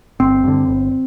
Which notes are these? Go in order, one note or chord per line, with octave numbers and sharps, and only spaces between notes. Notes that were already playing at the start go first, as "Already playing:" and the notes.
G1 C4
G2 D3
G1